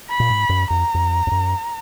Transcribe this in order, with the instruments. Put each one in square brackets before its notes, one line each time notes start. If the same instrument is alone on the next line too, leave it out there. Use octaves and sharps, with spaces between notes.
[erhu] B5
[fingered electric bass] A#2
G#2
F#2
[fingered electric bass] F2 [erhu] A#5
[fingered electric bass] F2
F2
F#2